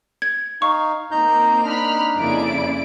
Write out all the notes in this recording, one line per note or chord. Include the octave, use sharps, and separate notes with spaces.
G#6
D#4 F5 C#6
A#3 C4 D#4 A#5 G6
D4 D#4 B5 F6
F2 C#3 A#3 E4 D5 D7